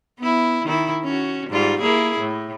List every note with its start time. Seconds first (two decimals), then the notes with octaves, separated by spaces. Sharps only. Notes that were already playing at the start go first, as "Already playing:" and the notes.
0.18 B3 E4
0.65 D#3 E4
1.04 C#4 F#4
1.49 G#2 G3 F4
1.80 A#3 E4 G#4
2.19 A2